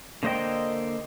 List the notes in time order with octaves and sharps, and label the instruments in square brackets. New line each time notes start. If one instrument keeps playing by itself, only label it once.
[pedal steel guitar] D3 A#3 C5 D#5 G5